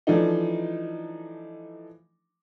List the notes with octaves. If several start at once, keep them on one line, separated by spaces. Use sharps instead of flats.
E3 F3 A3 D4 D#4